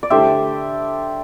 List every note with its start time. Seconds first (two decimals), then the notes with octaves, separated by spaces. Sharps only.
0.03 D5
0.10 D3 A3 E4 G4 C5 E5